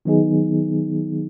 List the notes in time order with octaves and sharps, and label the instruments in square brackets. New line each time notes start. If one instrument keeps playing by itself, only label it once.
[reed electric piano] D#3 F#3 B3 D#4 G#4